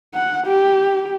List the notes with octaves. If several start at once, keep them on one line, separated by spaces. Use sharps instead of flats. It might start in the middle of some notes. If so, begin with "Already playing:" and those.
F#5
G4